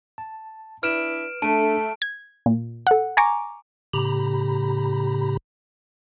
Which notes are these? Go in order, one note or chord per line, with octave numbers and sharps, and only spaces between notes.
A5
D4 E4 B4 F6 D7 E7
A3 D4 A4 A5 D7
G#6
A#2
A4 F#5
G#5 A#5 C#6 D6
A2 C#3 G4 A#5 B5